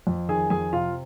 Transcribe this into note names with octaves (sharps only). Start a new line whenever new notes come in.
F2
D#3 G#4 G#5
F2 G#4 G#5
C3 F4 F5